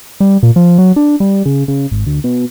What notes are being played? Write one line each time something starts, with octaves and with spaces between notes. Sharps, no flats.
G3
A#2
F3
F#3
D4
G3
C#3
C#3
G#1
D2
B2